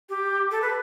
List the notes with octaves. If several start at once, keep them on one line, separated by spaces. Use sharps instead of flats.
G4
A4
B4